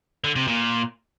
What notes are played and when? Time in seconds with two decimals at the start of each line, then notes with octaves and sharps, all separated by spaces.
0.24 D3
0.36 C3
0.48 A#2